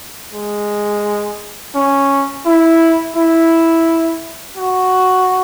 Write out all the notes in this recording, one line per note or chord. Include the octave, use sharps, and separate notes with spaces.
G#3
C#4
E4
E4
F#4